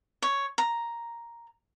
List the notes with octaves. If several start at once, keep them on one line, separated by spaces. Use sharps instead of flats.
C#5
A#5